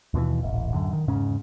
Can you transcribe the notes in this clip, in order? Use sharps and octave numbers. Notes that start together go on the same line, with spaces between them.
D#2 B2 D3 E3
D#1 A1
D1 F#2 D3
D#3
E2 G#2 C#3 C#4